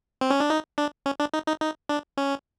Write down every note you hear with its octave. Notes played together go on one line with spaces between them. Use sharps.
C4
C#4
D4
D#4
D4
C#4
D4
D#4
D#4
D#4
D4
C#4